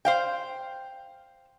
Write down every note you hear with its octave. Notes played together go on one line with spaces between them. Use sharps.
C5 F5 G5